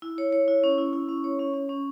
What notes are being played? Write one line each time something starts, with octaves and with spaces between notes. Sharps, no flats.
E4
C#5
C#5
E4
C#4
E4
E4
C#4
C#5
C#4
C#4
C#4